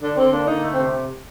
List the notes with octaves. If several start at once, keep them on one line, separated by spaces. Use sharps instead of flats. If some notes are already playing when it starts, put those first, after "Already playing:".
D3 D4
D3 C4
A#3 D4
D3 D#4
A3
C4
C3